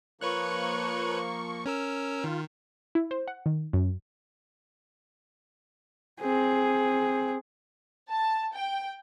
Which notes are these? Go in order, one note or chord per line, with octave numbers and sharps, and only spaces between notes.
F3 A#3 B4 C#5 C#6 F#6
C#4 A#4 E6
D#3 F4
E4
C5
F#5
D#3
F#2
C4 G#4
A5
G5